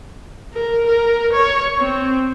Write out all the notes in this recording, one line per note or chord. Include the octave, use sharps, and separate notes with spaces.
A#4
A#4
C#5
C4